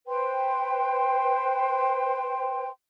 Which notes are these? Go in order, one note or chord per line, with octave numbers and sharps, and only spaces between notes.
B4 C5 G5 C6